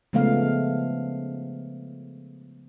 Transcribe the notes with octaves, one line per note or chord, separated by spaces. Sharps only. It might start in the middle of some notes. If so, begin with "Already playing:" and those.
C#3 F3 G#3 A3 B3 F5